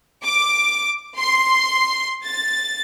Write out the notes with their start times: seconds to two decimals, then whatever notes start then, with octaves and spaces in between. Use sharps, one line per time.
0.25 D6
1.19 C6
2.27 A6